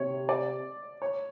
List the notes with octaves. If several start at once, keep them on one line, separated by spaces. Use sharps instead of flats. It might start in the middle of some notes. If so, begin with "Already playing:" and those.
Already playing: C3 C#5
D5
C#5